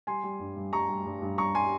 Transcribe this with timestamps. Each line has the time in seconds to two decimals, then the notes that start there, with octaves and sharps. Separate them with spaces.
0.07 G3 G#5 C6
0.24 G3
0.40 G2
0.56 G2
0.73 G3 A#5 C#6
0.89 G3
1.06 G2
1.22 G2
1.38 G3 A#5 C#6
1.55 G3 G#5 C6